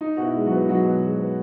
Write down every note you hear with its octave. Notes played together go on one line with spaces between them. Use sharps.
D#4
B2 F#4
E4
G#3
F#3 F#4
B3
F#3 D#4 F#4
B2
G#3
B3